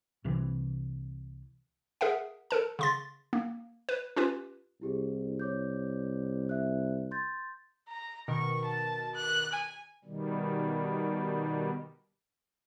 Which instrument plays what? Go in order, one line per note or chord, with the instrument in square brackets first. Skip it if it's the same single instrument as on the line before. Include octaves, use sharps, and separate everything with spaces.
[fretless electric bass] C2 C3 E3
[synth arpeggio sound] G#4 A#4 E5 F#5
A4 A#4 A5
C#3 C6 A6
A#3
B4
C#4 F4 G4 B4
[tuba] C2 [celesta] E4 G4 G#4
[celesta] C#5 D6 G6
E5 F#6
C6 G6 A6
[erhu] A#5
[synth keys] B2 D#3 A#4 [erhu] C#6
[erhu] A5
F#6
G#5
[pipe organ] B2 D#3 G3